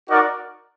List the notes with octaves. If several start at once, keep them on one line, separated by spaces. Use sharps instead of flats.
D#4 F#4 A#4 D5